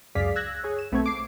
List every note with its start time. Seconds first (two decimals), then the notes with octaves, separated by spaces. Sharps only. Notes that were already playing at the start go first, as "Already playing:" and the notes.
0.15 C#2 F#2 G#4 D5 F5 B6
0.36 E6 F#6 G#6 A#6
0.63 G#4 C#5
0.79 E7
0.92 B1 A3 B3 C4 C#6 G#6
1.06 D6 C7